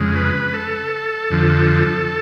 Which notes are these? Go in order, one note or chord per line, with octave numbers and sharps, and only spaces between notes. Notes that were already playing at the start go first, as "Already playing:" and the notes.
Already playing: F2 C#3 G#3
B4
A4
F2 D3 F3